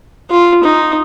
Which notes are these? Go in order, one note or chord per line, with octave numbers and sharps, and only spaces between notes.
F4
D#4